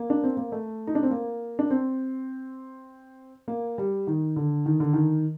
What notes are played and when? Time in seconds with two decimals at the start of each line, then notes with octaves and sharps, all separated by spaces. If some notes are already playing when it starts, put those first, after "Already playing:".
Already playing: A#3
0.10 D4
0.24 C4
0.37 A#3
0.52 A3
0.87 D#4
0.95 D4
1.03 C4
1.11 A#3
1.59 D4
1.70 C4
3.48 A#3
3.78 G3
4.07 D#3
4.36 D3
4.66 D#3
4.80 D3
4.93 D#3